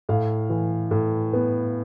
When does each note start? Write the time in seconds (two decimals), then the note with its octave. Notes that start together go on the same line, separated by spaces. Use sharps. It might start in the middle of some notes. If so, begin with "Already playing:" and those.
0.09 A2 F5
0.50 E3
0.91 A2
1.33 B3